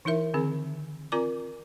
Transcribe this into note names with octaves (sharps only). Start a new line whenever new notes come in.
E3 D#4 E4 A#4 E5
D3 D#3 C4 G#4
C4 F4 A#4 D5 A#5 D6